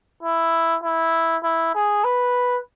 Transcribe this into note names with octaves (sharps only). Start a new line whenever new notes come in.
E4
E4
E4
G#4
B4